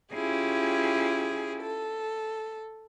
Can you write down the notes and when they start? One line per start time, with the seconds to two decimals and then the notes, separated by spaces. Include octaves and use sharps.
0.13 C#4 E4 F4 G4 G#4
1.62 A4